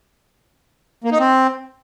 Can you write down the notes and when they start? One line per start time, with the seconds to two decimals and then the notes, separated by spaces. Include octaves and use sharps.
1.04 A#3
1.12 D#4
1.19 C4